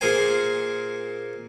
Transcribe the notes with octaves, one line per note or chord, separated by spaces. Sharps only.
A#2 G#4 A#4 C5 G#5